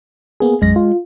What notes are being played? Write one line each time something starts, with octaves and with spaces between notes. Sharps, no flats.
A#3 B3 G#4
B1 F#2 G#3 A#6
F4